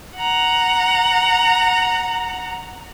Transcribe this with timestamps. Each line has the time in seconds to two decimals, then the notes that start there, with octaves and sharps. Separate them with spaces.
0.17 F#5 A#5